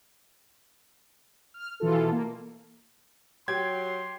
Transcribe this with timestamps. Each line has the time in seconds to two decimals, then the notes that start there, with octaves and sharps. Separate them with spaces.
1.54 F6
1.80 B2 E3 F4 A4
2.12 A#3
3.48 F#3 G4 C6 G#6